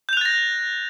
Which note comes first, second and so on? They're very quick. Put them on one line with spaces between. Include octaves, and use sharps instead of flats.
G6 F7 F#6 A6 A#6